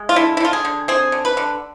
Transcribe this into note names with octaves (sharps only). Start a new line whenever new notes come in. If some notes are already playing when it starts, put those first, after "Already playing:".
Already playing: G#3
F4
D3 E4
E4
D3 F4
G#4
D3
C4 G#4
D3
B4
D3